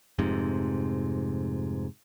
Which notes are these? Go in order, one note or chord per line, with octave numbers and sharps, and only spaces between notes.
F1 F2 G#2 C3